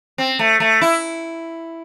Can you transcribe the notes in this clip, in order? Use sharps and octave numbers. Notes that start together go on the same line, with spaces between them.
C4
A3
A3
E4